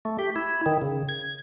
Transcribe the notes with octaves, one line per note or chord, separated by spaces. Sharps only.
A3
G4
E4
D#3
C#3
G#6